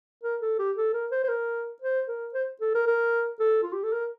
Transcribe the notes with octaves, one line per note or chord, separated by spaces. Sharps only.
A#4
A4
G4
A4
A#4
C5
C5
A#4
C5
A#4
C5
A4
A#4
A#4
A4
F4
G4
A4
A#4